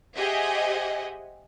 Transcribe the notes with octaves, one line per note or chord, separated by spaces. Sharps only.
G4 G#4 C5 D#5 E5 F#5